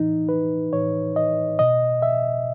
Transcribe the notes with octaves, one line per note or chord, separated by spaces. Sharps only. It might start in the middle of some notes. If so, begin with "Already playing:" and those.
Already playing: A2 E3 D#4
B4
A2 E3 C#5
D#5
B2 D#5
E5